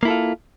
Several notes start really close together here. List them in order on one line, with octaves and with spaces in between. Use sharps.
A#3 E4 A4 F4